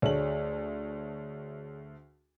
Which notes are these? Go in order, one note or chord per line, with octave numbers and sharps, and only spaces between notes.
D2 A3 G#4 C#5 D5 F#7